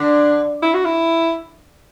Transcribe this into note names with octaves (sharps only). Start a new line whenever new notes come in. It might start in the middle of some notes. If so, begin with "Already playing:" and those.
Already playing: D3 D4
E4
F#4
E4